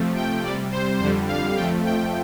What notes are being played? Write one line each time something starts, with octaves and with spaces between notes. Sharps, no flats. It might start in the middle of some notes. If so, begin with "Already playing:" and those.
Already playing: C3 F3 A3
G5
C3 G3 D5
C5
F2 D3 G3 C5
F5
F2 F3 A3 G5
G5